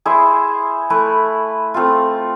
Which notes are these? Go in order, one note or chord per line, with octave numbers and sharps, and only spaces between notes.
E4 G#4 C5 E5
A3 E4 B4
A3 C4 F4